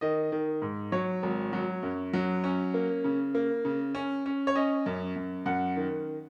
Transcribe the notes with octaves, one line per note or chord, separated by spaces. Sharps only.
D#3 D#5
D#3
G#2
F#3 C#5
G#1
F#3
F#2
F#3
C#4
A#3
C#3
A#3
C#3
C#4
C#4
C#5
C#4 D#5
F#2
F#2
F#2 F#5
D#3